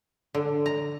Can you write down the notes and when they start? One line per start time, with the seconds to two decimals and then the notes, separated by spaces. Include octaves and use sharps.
0.35 D3
0.66 A#5